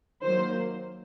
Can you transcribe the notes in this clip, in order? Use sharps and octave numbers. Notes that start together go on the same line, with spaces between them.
D#3 F#3 A#3 C5